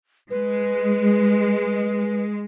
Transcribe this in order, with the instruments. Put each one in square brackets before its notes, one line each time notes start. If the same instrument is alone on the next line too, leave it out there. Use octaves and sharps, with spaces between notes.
[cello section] G#3 [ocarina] B4